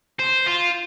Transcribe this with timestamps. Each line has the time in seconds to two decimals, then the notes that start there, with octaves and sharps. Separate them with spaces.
0.20 C5
0.47 F4